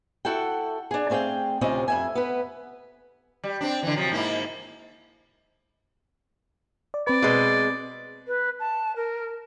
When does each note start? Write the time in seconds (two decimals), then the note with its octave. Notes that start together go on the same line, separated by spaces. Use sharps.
0.25 E4 F#4 A4 F#5 G5
0.91 D4 G#4
1.10 A3 C4 G#4 F5 G5
1.61 D2 C3 C4 C#4 F4 D#5
1.88 F2 E5 G#5
2.15 B3 B4
3.44 G3
3.61 C4 D4
3.83 D3 E3
3.96 C3 F3 F#3
4.12 G#2 A#3 E4
6.94 D5
7.07 C4 B4 D5
7.22 B2 G#3
8.27 B4
8.59 A5
8.96 A#4